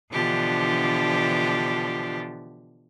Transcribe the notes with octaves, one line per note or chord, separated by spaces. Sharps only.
B2 D3 E3 F3 D4 G4